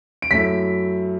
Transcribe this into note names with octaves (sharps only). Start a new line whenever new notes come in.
D7
F#2 F#3 A3 E4 B6